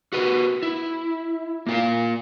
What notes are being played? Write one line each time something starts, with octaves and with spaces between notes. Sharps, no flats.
F#4 G4 B4
E4
A#3 F4 F5